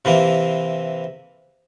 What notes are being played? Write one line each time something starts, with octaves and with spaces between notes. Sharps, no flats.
C3 E3 A#3